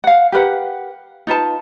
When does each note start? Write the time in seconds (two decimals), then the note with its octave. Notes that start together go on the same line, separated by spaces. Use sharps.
0.04 F5 F#5
0.32 G4 A#4 B4 F#5
1.27 D#4 F4 B4 A5